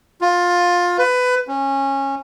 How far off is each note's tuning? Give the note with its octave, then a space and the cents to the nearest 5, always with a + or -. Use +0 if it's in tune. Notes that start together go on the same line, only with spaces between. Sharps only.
F4 +20
B4 +20
C#4 -20